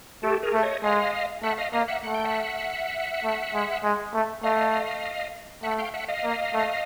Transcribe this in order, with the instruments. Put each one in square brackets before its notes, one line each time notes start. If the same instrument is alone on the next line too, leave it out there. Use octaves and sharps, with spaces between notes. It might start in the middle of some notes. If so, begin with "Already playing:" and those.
[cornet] A3 [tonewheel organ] G4 A4
[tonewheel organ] G#4 A#4
[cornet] A3
[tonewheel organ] C#5 D#5
[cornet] G#3 [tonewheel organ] D#5 F5
[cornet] A3 [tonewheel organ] E5 F#5
[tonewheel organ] D#5 F5
[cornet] A#3 [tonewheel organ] D#5 F5
[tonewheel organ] E5 F#5
[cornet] A3 [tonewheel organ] F#5
[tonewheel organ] G5
E5 F#5
[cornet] A3
G#3
G#3
A3
[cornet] A3 [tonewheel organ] D#5 F5
[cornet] A3 [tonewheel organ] E5 F#5
[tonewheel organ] F5 G5
E5 F#5
D#5 F5
[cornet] A#3
A3